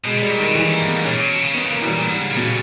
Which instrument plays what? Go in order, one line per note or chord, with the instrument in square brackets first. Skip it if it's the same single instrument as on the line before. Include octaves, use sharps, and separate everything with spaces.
[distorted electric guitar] B2 [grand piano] G#3
[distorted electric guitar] B2 [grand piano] G3
[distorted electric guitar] A#2
[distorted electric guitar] B2 [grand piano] D#3
[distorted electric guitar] C#3 [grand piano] E3
[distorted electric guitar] E3 [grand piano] A#3
[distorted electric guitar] G2
[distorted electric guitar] G#2 [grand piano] B3
[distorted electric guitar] A#2 [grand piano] C#4
[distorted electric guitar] A#2
B2
C#3
[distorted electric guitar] D#3 [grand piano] B3
[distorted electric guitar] C#3 [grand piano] A#3
[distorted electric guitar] B2 [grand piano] E3
[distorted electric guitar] A#2 [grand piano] G3
[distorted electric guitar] G#2 [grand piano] G3
[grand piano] C#3
[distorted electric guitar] A#2
[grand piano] B2